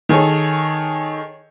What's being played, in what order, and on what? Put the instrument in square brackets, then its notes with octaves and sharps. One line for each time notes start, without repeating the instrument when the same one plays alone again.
[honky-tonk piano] D#3 G#4 A4 C#5